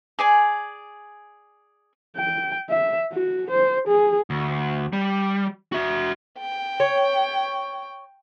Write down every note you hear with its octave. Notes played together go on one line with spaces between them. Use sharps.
G#4 D5 G#5
G5
E5
F#4
C5
G#4
D2
G3
F#4 E5
G5
C#5